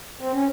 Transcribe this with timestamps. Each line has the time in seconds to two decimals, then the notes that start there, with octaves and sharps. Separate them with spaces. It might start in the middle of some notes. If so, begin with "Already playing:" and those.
0.20 C4
0.33 C#4